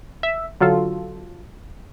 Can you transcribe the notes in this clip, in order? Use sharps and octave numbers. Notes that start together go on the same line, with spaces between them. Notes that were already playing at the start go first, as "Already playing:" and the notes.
E5
D3 F#3 F4 A4